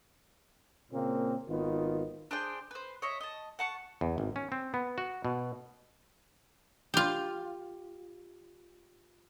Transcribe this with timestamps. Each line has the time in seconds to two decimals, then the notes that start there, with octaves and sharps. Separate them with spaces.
0.91 A#2 C#3 A#3 C4
1.48 G#1 D#3 B3 F4
2.31 D4 G#4 C5 G5
2.71 B4 C5
3.02 C#5 D#5 E5
3.21 D#5 A5
3.59 F#5 A5 C#6
4.01 E2
4.18 G#1
4.36 C#4
4.52 C4
4.74 B3
4.98 F#4
5.25 B2
6.94 F4 G4